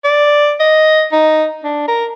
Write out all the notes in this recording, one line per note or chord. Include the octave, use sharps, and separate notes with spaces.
D5
D#5
D#4
D4
A#4